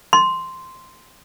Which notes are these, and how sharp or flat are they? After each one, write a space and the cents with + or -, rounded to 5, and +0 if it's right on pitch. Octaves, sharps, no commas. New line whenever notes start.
C6 -5